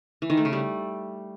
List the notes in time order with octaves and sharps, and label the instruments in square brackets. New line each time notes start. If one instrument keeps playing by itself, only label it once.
[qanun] E3
D#3
A3
C#3
G3